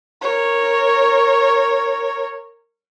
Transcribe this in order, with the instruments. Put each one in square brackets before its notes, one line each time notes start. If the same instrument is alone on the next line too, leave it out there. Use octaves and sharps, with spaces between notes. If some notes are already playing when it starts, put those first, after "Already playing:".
[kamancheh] A#4 C#5